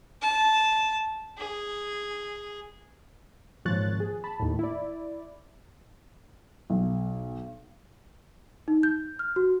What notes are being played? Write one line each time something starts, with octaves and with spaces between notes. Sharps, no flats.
A5
G#4
G#1 A#2 F3 C#5 F#6 A6
G#4
A5 B5
D#2 A2
E4 D5
B1
D#4
G6
F6
F#4